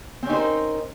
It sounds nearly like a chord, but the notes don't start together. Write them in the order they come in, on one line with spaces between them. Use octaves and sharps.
C4 C#4 D#4 C5 A#4